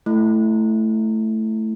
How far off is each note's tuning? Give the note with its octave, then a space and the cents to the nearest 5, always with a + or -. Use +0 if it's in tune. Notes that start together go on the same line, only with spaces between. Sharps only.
A3 +0 E4 +10